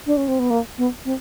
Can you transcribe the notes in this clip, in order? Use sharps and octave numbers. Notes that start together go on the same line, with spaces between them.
D4
C#4
C4
B3
A#3
B3
C4